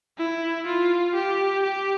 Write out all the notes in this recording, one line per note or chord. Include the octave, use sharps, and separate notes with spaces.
E4
F4
G4
G4